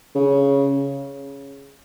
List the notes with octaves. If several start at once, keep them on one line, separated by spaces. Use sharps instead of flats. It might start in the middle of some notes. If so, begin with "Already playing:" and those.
C#3